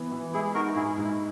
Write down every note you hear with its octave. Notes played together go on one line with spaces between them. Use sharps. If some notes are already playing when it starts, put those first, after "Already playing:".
Already playing: E3 B3
E3
G#3 E4 G#4
D#4 F#4 A#4
G#2 E4 G#4
G#2
E4